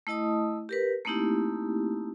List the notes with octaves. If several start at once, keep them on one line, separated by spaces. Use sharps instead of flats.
A3 E4 D#5 A5 D#6
G4 A#4 B4
A3 A#3 C4 D#4 E4 G4